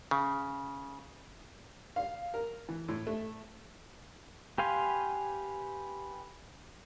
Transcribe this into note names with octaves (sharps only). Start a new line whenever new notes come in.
C#3
F5
A#4
E3
A2
A3
G4 B4 F5 G#5 C6